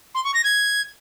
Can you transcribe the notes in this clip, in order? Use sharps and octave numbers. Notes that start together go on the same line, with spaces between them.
C6
C#6
A#6
G#6